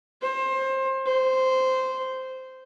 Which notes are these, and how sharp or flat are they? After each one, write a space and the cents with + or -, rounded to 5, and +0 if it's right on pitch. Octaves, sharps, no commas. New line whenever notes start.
C5 +25
C5 -10